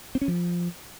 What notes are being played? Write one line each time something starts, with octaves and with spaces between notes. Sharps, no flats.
C4
C#4
F3